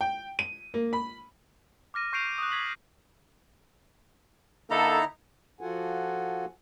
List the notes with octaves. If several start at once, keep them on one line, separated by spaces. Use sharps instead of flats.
G5
D#7
A#3
B5
D6 F6 A#6 D#7
C#6 G6 C7 D7 D#7 F7
D#6 F#6
G#6 B6 F#7
D3 A#3 D#4 E4 A4 A#5
F3 F4 F#4 A4 F#5 G#5